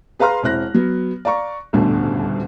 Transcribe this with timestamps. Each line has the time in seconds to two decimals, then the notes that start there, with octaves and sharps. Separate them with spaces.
0.19 G#4 B4 F5 A#5 C6 F6
0.43 E1 C4 E4 F#6 A#6
0.74 F#3 B3
1.25 D5 F5 A#5 C#6
1.73 D#1 A1 D2 G2 B2 D3